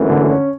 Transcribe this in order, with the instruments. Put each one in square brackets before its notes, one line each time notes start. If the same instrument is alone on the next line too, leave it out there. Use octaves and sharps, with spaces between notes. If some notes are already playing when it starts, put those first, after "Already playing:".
Already playing: [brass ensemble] G#1 F#2 E3 A3
[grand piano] D3
C#4